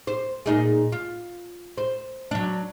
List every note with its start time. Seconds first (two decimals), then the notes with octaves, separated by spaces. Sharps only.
0.07 C5
0.46 A#2 D#4 G#4
0.92 F4
1.78 C5
2.31 F#3 D4